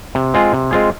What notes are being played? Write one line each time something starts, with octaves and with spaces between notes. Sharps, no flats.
C3
G#3 C4 F4 G#4
C3
G#3 C4 F4 G#4